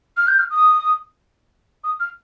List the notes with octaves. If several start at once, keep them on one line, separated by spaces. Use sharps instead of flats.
F6
G6
F6
D#6
D#6
F6